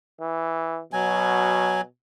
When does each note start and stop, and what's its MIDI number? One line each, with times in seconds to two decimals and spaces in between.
0.21 0.81 52
0.93 1.86 47
0.93 1.81 54
0.93 1.81 80